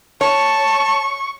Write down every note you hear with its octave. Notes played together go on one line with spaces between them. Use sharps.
C#5 A5 C#6